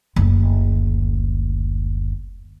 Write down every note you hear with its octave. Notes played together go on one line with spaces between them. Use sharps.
F#1 D2